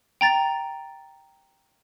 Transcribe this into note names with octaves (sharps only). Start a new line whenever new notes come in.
G5 A#5 A6